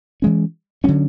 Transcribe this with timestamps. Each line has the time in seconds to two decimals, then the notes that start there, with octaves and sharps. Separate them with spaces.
0.22 E3 G#3 C#4
0.84 D3 F#3 A3 C#4